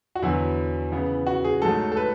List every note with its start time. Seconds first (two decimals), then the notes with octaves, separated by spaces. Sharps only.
0.15 F#4
0.22 E2 D3 F#3 B3 E4
0.92 C#3 E3 B3
1.26 F#4
1.44 G#4
1.62 G#2 F#3 A3 A4
1.92 A4
1.97 B4